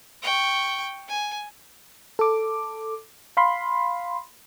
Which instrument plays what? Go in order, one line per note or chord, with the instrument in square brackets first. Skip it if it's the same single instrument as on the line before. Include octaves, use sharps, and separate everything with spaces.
[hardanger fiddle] G5 C#6
G#5
[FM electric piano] A4 D6
F5 B5 C6